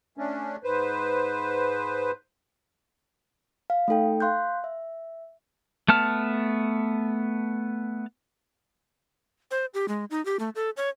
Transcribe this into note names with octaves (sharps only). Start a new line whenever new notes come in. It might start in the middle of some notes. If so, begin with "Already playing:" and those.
A3 C#4 D4
G#2 B4 C5
F5
A3 D#4 A4 G5
F5 C6 F#6 G6
E5
A3 B3 A5 F6
C5
G4
G#3
D#4
G4
A3
A4
C#5